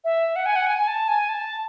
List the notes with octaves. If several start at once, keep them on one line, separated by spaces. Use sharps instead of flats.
E5
F#5
G#5
F#5
G#5
G#5
A5
G#5
A5